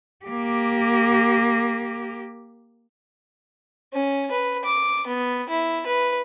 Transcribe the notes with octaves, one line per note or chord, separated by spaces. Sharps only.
A#3 G4
C#4
B4
D6
B3
E4
B4